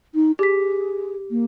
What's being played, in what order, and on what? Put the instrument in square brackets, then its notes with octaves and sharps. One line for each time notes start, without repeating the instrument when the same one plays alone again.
[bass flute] D#4
[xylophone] G4 B6 [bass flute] G#4
[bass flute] A#3